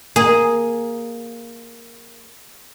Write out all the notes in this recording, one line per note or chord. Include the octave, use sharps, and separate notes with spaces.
A#3 G#4